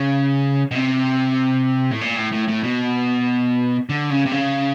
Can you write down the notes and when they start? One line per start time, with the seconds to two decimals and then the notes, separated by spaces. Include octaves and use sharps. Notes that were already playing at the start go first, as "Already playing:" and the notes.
Already playing: C#3
0.71 B2
0.75 C3
1.91 A2
2.02 A#2
2.17 A2
2.33 A2
2.48 A2
2.64 B2
3.89 D3
4.11 C#3
4.26 C3
4.32 C#3